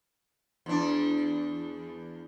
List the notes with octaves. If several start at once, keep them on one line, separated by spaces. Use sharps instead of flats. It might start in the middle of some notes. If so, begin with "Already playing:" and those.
E2 D4